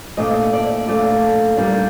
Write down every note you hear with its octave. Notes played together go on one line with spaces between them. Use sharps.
A#2 A3 D4 D#5
D5
A#2 A3 D4
A#2 G3 A#3 D4